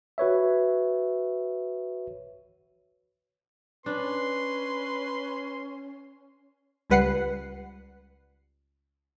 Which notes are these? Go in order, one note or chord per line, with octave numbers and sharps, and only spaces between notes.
F#4 B4 C#5 E5
C#4 D4 B4 C6
C#2 G3 B4 F#5 C7 C#7